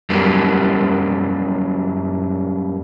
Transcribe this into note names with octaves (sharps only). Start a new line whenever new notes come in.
F#2 F#3 G3 A#3 B3